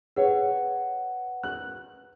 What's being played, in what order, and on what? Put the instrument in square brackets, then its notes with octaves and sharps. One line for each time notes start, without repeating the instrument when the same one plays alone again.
[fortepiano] G#4 C#5 [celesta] B4 F#5
[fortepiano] F#6